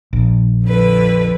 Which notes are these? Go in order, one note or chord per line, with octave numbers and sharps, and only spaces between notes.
A#1
F2 D3 B4